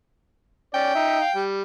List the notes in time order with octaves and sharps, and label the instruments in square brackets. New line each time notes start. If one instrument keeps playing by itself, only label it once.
[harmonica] C#4 D5 [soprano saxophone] G5
[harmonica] D#4 E5
F5
G3